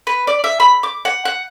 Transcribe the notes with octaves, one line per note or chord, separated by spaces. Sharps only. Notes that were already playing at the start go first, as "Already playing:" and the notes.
B4
D5
E5
B5
D6
F#5
F#5